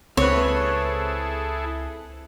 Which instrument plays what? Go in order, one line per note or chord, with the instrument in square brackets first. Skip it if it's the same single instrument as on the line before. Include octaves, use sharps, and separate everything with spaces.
[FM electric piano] C#2 F#6 [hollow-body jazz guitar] C4 B4 [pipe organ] E4 G#4 A4 [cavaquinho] C#5